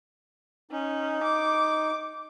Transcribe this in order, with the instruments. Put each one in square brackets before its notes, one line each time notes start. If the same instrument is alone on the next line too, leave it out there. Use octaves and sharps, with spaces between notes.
[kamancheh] C#4 [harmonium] D#4
[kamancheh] D6